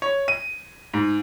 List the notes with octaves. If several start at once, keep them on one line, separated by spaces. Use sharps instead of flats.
C#5
D#7
G#2